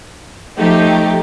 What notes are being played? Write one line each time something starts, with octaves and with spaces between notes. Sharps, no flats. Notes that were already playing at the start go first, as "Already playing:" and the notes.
F3 A3 D#4 G4